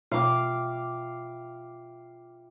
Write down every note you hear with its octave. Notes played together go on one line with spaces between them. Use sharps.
B2 F4 E5 F5 G5 D6